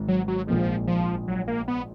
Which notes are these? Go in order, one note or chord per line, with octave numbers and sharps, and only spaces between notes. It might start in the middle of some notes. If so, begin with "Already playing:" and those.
Already playing: G#1 G#2
F#3
F#3
A#1 A#2 F3 G#3
F3
F#3
A#3
B3